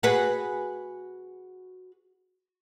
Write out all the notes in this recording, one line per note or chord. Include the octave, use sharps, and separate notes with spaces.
F#4 G#4 B4